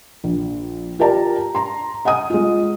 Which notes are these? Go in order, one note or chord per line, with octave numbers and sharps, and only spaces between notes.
A#1
F4 G4 A#4 D5 A5 A#5
A#5 C6
D#5 F#5 G#5 D#6
G#3 F4